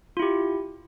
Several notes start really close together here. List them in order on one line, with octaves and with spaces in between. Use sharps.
F4 E4 G4